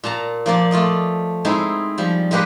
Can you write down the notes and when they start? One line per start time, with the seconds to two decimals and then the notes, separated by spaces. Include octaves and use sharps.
0.04 A#2 A5 A#5
0.46 F3 A#3 D5
0.71 A3 F4 D5 D#5
1.45 G#3 C4 D#4 E4
1.98 F3 G3
2.31 G#3 A#3 G4 B4 A#5